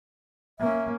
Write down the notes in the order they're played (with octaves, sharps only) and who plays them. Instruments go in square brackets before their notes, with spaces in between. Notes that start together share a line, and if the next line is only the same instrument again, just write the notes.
[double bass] A#3 C#4 [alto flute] E5